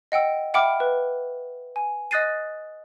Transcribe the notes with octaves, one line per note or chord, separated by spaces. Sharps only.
D#5 F#5 G5 E6
E5 F#5 G5 B5 D6 F6
B4
G#5
D#5 D#6 F#6 A6 C7 D#7